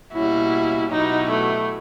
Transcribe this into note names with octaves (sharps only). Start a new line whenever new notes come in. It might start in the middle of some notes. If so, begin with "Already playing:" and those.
B2 G3 A#3 C#4 E4 F#4
B2 F#3 B3 D#4 E4 G4
A3